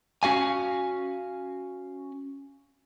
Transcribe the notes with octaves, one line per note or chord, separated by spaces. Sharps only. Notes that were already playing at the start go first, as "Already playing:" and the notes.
C#4 F#4 F5 G#5